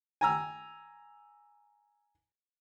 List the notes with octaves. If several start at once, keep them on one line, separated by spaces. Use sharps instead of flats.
G#5 A#5 E6